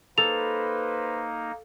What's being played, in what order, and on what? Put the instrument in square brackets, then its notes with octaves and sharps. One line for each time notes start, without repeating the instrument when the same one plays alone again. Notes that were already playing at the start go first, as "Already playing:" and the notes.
[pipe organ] A#3 D#4 [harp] A4 [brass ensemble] B4 C5 [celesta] F7